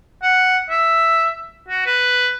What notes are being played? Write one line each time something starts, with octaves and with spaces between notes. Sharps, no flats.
F#5
E5
F#4
B4